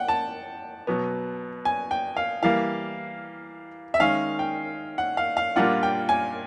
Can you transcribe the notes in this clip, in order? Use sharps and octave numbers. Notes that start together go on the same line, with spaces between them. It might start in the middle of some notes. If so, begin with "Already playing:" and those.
Already playing: F#5 G5
A5
B2 F#3 B3
G#5
G5
F5
E3 G3 A#3 F5
E5
D#3 G#3 C#4 F5
G5
F#5
F5
F5
A#2 G3 A#3 D4 F4 F#5
G5
G#5